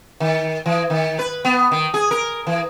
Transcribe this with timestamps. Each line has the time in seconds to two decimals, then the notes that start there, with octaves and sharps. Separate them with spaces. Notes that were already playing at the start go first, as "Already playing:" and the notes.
0.20 D#3
0.66 E3
0.90 D#3
1.19 B4
1.45 B3
1.72 D#3
1.94 G#4
2.11 A#4
2.47 E3